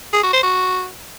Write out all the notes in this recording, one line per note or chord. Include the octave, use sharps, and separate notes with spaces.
G#4
F#4
C5
F#4